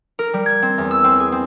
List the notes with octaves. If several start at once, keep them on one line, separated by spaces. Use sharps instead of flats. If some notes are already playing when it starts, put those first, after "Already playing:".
A#4
G3
G#6
C4
E2
E6
C4
G#4
C4